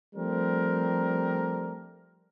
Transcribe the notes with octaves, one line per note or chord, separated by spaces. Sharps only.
F3 G3 A3 C4 D4 A#4